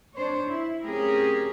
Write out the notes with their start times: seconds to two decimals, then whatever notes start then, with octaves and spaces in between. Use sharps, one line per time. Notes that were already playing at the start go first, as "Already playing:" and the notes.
0.14 D4 C5 C#5
0.50 E4
0.84 A3 C4 C#4 G4 G#4 A#4